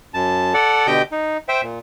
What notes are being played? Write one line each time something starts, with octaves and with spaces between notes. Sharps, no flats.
F#2 A5
A4 D5 F#5
B2 D3 G4 D#5 G5 G6
D#4
C5 E5 G5
A#2